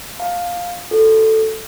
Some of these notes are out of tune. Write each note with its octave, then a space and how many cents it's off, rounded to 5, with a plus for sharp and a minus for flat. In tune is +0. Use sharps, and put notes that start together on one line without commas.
F5 +10 A5 +0
F#4 +0 A4 +0